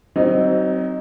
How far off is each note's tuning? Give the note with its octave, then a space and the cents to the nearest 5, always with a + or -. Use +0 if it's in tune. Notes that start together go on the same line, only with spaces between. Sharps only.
F#3 +35 C4 +0 D#4 +0